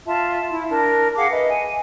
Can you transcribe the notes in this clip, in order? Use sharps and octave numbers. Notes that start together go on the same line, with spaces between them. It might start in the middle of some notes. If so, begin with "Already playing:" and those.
F4 E5 A5
E4 E5
D4 A#4
G#4 F5 F#5 D6
B4 D#5 E5
G#5